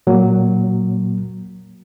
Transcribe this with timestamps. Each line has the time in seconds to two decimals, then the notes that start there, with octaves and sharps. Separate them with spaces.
0.07 A#2 F#3 A#3